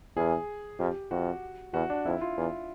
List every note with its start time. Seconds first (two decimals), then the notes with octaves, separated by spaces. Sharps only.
0.16 E2 G#4
0.79 F2 G4
1.11 F2 F#4
1.73 E2 F#4
1.90 D4
2.05 F2 E4
2.21 F4
2.37 E2